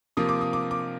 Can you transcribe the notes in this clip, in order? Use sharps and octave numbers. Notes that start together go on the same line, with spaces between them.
C3 F3 A#3 D#6
D6
D#6
D6
D6